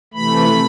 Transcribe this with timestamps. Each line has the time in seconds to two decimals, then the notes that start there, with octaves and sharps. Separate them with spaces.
0.14 C3 E3 A3 B5